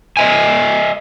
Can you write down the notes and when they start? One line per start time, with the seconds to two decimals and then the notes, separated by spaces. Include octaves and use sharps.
0.17 D#5 E5 G#5